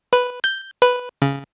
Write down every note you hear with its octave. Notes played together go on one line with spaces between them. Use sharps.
B4
G6
B4
C#3